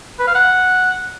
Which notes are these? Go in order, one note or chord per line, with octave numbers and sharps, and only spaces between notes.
B4
F5
F#5